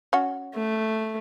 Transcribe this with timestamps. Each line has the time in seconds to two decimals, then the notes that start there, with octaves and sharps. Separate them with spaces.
0.13 C#4 F#4
0.54 A3